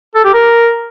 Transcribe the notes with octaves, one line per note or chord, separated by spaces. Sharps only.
A4
G4
A#4